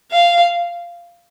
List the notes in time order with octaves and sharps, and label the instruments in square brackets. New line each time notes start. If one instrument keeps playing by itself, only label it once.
[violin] F5